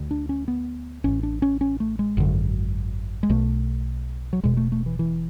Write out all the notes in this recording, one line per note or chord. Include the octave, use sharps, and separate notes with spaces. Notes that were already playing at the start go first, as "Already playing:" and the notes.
Already playing: D2 D3
D4
C#4
B3
A1 A2 C#4
D4
C#4
C#4
A3
G#3
G#1 F#2 D3
G#3
B1 B2 A3
F#3
E1 E2 B2 G#3
A3
A3
E3
E3